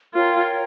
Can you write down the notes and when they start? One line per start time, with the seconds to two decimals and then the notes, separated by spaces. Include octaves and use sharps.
0.14 F4 A#4 C#5 G5 A#5